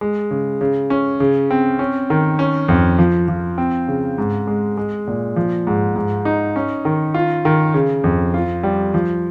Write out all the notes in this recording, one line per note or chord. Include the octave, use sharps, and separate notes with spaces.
G#3
C#3
C#3
C#4
C#3
C4
C#4
D#3
C#4
F2
F3
F3
C4
C#3
G#2
G#3
G#3
A#2
F3
G#2
G#2
D#4
C#4
D#3
F4
D#3
C#3
F2
F4
G3
F3